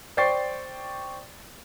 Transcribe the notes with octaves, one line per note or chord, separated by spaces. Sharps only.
C5 D5 G5 C#6 A6 C7